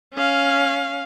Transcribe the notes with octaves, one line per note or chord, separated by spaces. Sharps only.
C#4 F5